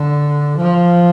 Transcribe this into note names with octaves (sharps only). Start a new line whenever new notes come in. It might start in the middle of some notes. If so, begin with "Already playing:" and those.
Already playing: D3
F3